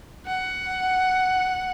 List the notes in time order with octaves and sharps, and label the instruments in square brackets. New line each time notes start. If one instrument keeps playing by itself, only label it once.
[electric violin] F#5